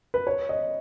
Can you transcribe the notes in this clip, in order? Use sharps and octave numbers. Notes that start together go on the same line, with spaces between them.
B4
C#5
D#5